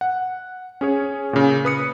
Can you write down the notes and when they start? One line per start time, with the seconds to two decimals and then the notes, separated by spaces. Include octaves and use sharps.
0.01 F#5
0.81 C#4 G#4 C#5
1.33 A#2 C#3
1.65 B4 D#6 C#7